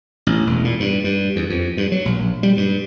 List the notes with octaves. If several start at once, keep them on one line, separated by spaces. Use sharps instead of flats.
A1
E1
A#2
G2
G2
E2
F2
G2
F#3
A#1
G3
G2